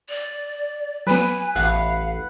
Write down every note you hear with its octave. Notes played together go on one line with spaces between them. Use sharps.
D5
F#3 B3 B4 G#5
A1 F5 F#5